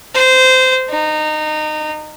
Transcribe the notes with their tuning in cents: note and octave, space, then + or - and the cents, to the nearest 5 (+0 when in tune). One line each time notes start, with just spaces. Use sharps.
C5 -20
D#4 -20